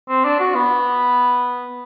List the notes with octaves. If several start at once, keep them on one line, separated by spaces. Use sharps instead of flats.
C4
D4
F#4
B3